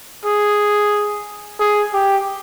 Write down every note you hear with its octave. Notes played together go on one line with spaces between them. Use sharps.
G#4
G#4
G4